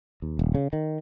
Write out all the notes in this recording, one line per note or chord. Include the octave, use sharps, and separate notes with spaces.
D#2
D#1
C#3
D#3